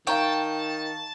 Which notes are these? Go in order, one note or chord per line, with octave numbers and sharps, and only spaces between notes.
D#3 F5 G5 A5 A#5 C#6